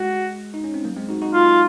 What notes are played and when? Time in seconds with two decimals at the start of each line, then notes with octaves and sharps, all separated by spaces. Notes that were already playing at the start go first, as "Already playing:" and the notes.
Already playing: G#3 F#4
0.54 D#4
0.64 C#4
0.74 C4
0.84 F#3 A#3
0.97 G#3 C4
1.09 D#4 F#4
1.22 D#4 F#4
1.34 F4